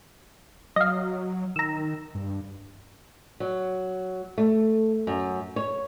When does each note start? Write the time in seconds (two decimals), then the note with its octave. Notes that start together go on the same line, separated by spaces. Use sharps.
0.76 F#3 D#5 F5
1.56 D#3 A#5 E6
2.15 G2
3.40 F#3
4.38 A3
5.07 F#2
5.56 C#5